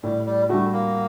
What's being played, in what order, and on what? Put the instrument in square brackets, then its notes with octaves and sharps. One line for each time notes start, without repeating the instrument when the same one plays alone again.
[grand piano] A2 [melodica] G3
[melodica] G3
[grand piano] G3 D4 F#4 [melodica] A3
[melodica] A#3